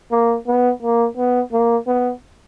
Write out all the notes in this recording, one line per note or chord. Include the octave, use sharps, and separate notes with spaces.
A#3
B3
A#3
B3
A#3
B3